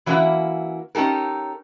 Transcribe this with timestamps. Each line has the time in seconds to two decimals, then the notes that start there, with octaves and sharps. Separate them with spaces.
0.06 E3 F#3 A#3 C#4 E4 F#4
0.95 C#4 D#4 G4 A4 A#4